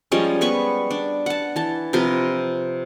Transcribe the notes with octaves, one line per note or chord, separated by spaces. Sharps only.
F3 G3 G#3 C#4
B3 B5 C#6
D4
F#5 A5
E3 A5
C3 F3 A#4 B4